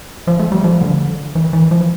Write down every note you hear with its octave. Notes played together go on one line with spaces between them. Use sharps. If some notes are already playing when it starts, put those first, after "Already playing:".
F3
A3
G3
F3
D3
E3
E3
F3